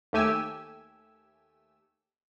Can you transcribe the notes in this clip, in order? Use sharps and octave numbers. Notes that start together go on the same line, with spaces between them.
D#2 A3 G4 G#5 E6